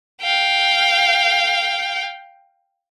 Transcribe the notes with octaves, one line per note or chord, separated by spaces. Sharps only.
F5 G5